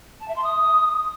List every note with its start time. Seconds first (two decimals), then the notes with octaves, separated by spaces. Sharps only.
0.20 A5
0.28 E5
0.36 C6
0.44 D#6